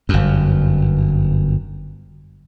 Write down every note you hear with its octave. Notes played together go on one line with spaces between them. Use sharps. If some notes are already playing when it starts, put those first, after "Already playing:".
G1 F#2